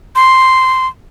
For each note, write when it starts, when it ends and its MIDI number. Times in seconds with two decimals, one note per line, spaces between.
0.16 0.87 84